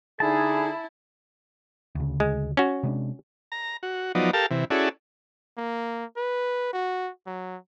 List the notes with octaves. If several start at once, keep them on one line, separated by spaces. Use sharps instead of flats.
D3 D#4 E4 G#4 G#5 A5
D2 C#3
G#3
C#4 F#4
C3 G#3 D4
A#5
F#4
F3 F#3 B3 D#4 D5
G4 A4 A#4 F5 A5
C3 E3
C#4 E4 F#4 G#4 A4 D5
A#3
B4
F#4
F#3